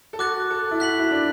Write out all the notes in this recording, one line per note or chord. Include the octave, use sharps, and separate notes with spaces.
A4
F#4 D6 F#6 A6
A4
E4
F#4 F#6 B6 F#7
E4
D4